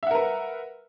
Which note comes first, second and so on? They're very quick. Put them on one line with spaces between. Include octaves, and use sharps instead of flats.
E5 F#5 A#4 B4